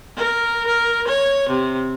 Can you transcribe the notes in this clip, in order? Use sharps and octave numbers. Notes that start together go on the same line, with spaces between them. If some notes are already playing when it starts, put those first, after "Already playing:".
A#4
A#4
C#5
C3